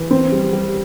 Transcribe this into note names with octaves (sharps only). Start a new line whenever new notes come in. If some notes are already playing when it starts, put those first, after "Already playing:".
Already playing: E3
C4
G3
G3